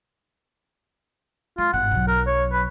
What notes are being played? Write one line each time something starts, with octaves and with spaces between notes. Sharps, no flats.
G#3 F4
G1 G#2 F#5
B1 F#3
A#4
C#5
B4